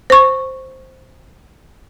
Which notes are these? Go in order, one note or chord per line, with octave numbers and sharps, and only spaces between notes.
C5 C#6